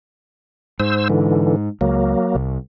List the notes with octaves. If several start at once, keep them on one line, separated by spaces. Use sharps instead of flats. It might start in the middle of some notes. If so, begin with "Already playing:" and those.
G#2 C5 E6
D3 E3
C#2 F#3 A#3
C2